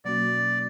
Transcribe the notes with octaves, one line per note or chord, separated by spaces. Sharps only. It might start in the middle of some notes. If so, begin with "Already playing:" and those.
B2 F#3 A#3 C#4 F#4 D5